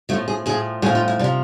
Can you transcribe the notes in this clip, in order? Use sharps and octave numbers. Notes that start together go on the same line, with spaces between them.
A2 F3 A3
G#4
A2 F3 G#4
A2 F3 G#4
F4
E4
C3 F3 D4